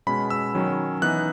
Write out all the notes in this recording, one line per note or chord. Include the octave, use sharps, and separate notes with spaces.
B2 G#3 C#4 B5
E6
D#3 F#3 C#4
E3 B3 D#4 F#6